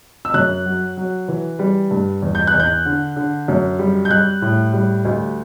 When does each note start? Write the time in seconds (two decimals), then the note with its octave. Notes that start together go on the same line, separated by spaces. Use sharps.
0.25 E6
0.34 F#2 F#6
0.66 F#3
0.97 F#3
1.28 E3
1.59 G3
1.91 G2
2.22 E2
2.35 G6
2.47 F#6
2.54 E2
2.60 G6
2.85 D3
3.16 D3
3.48 F#2
3.79 G3
4.05 G6
4.10 G3 F#6
4.42 A2
4.73 G3
5.05 D2